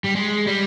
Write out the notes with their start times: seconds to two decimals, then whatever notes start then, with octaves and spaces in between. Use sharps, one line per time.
0.04 G3
0.15 G#3
0.47 G3